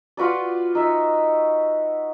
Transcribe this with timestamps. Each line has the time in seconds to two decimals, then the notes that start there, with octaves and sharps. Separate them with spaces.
0.17 F4 F#4 B4 D5
0.75 D#4 E5